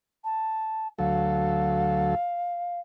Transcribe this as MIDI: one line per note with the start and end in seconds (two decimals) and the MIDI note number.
0.24 0.87 81
0.99 2.15 38
0.99 2.15 54
0.99 2.15 69
0.99 2.80 77